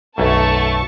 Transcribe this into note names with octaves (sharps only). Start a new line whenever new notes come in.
B1 F#2 A3 A5 C#6